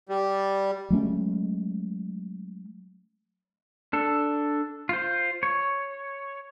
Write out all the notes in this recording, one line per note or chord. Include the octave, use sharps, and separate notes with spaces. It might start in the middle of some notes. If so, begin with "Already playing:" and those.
G3
F#3 G#3 A3 C#4
D4 A4
F4 C5
C#5